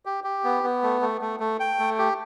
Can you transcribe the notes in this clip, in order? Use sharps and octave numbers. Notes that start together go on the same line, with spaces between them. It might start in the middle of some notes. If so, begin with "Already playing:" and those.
G4
G4
B3
B3
A3
A3
A3
A3
G5
A3
G4